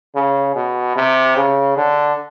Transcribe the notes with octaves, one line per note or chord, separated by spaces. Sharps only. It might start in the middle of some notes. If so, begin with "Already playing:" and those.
C#3
B2
C3
C#3
D3